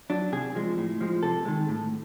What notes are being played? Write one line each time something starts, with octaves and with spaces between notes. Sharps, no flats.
F#3 D4
C3 G#4
F3 G#3
A2
F3 G#3
C3 A4
D#3 G#3
A2